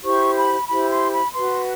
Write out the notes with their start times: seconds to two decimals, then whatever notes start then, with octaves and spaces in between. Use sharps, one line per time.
0.03 E4 G4 C5 C#6
0.36 B5
0.69 E4 G4 C5 B5
0.90 C6
1.13 B5
1.33 F#4 B4 C6